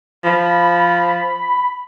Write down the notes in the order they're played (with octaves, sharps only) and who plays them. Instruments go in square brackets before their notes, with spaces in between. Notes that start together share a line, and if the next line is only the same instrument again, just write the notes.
[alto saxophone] F3 [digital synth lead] B5